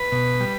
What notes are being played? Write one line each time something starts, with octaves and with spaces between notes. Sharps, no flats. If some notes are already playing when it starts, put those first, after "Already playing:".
Already playing: B4
B2
G3